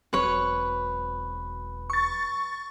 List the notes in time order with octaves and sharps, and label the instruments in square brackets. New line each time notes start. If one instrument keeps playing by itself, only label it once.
[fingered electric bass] E1 F#3 C4 [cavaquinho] B4 C#5
[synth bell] C#6 A6